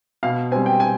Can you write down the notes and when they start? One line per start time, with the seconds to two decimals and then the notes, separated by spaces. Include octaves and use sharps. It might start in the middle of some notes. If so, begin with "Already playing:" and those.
0.23 B2 F5
0.52 C4 G#5
0.56 G3
0.66 G5
0.80 B2 G#5